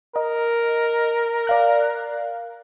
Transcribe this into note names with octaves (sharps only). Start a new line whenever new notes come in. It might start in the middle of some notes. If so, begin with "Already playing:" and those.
A#4 D#5
D5 F5 F#6